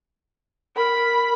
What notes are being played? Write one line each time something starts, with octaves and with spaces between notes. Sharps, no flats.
A#4 B5